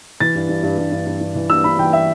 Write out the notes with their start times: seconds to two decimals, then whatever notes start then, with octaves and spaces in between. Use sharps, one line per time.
0.20 E3 A6
0.35 G2
0.49 G2
0.63 G2
0.78 G2
0.92 G2
1.06 G2
1.21 G2
1.35 E3
1.50 G2 E6
1.64 G2 B5
1.78 E3 G5
1.93 E5